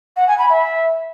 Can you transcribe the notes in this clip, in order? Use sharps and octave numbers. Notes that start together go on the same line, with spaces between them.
F#5
G#5
B5
E5